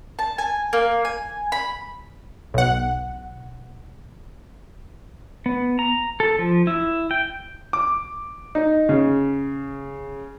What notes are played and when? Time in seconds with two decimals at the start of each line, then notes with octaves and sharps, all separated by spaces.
0.19 A5
0.38 G#5
0.73 A#3
1.05 G#5
1.52 B5
2.54 B1 F#5
5.46 B3
5.79 A#5
6.20 A4
6.39 F3
6.67 E4
7.11 G5
7.73 D6
8.55 D#4
8.89 C#3